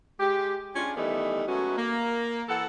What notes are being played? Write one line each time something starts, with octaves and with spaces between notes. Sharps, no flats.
G#3 G4
G#3 C#4 D4 F4
D#3 E3 G3 A3 B3 D#4
F#3 G#3 A3 B3 C#4 F#4
A#3
E3 A4 F#5